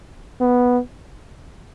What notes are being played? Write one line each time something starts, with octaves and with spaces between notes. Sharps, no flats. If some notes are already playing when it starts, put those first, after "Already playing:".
B3